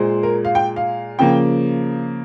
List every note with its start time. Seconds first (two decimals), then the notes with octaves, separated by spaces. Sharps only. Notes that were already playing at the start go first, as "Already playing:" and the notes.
Already playing: A#2 G#3 C5
0.23 A#4
0.45 F5
0.55 G5
0.76 F5
1.19 C#3 F3 A#3 G5